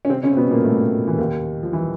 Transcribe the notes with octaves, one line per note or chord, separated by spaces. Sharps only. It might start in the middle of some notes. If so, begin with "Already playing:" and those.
C#4
C3 C4
C#3 C#4
C4
B2 B3
A#2 A#3
A2 A3
E3
D#2 D#3
F3
E3